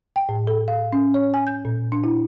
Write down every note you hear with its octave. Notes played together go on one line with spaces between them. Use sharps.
G5
A2
A4
F5
C#4
C#5
G#5
G6
A#2
D4
E4